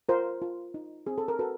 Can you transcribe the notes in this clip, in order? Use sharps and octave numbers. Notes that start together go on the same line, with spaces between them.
F4 A#4 C5
F4
D#4
C4 G#4
A4
A#4
F#4 A4 B4